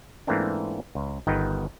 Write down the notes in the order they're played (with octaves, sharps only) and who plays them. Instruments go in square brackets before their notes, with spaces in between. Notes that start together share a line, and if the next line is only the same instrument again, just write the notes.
[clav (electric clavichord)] G#2 E3 A3 A#3 C4 D4
C#2
G1 D#3 B3 D#4 B4 G5